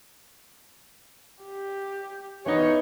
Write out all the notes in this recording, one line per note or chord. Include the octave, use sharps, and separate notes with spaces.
G4
E3 B3 D#4 C#5